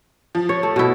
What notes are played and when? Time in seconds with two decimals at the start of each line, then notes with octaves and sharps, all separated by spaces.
0.35 F3
0.49 C#5
0.63 A3
0.76 B2 E4